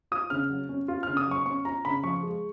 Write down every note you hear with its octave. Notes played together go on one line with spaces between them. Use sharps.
F4 D#6
C#3 F6
F#3
C#4
F4
C#3 F6
D#6
F#3 C#6
C#4 C#6
F4 A#5
C#3 B5
F3 C#6
G#3